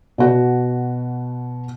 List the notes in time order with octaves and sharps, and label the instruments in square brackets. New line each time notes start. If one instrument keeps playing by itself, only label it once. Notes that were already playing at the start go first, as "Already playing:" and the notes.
[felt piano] B2 F#4